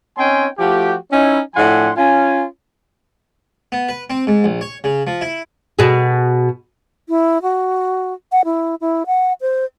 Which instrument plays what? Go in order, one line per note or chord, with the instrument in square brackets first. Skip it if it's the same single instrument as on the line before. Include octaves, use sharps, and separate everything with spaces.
[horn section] C4 C#4 D#4 G5 G#5 C6
F3 A3 F#4 G4
C#4 D#4 E4
A2 F3 D4 F#5 G#5 C6
C#4 F4 G#5
[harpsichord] B3
B4
C4
G#2
A#1
C#5
C#3
F3
E4
[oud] B2 G#4
[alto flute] E4
F#4
F#5
E4
E4
F#5
C5